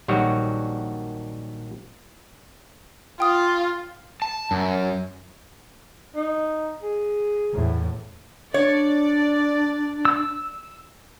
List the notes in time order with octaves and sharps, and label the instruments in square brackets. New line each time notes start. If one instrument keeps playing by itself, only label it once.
[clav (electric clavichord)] A#1 D#3 F#3 G3 F#4 C#5
[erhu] F4 [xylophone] G5 D#6
[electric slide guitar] A5
F#2
[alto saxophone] D#4
G#4
[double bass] E2 A2
[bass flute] D4 [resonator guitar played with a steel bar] C#5 [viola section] D5
[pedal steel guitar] E6